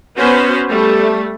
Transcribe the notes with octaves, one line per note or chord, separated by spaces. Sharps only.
B3 C#4 F#4 B4 C5
G3 A3